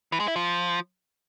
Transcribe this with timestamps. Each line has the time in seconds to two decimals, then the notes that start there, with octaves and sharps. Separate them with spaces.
0.12 E3
0.20 G#3
0.28 E4
0.36 F3